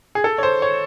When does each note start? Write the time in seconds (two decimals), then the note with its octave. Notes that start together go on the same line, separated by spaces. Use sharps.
0.15 G#4
0.24 A4
0.38 C#5
0.43 C5
0.62 C#5